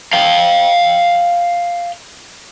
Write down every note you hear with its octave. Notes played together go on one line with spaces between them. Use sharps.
F5 G5